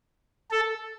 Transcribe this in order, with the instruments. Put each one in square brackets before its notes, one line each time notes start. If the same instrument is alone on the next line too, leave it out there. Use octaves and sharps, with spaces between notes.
[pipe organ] A4